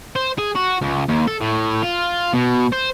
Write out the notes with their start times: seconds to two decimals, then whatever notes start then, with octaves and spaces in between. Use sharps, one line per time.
0.16 C5
0.39 G#4
0.56 F#4
0.81 C#2
1.08 D#2
1.28 A4
1.41 A2
1.83 F4
2.34 B2
2.72 C5